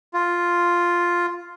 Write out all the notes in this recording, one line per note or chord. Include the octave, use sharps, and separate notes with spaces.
F4